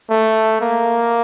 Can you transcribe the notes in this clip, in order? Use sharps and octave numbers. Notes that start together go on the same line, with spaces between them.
A3
A#3